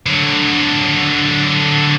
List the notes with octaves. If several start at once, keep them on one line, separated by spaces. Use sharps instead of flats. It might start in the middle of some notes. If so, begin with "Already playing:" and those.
D3 F#3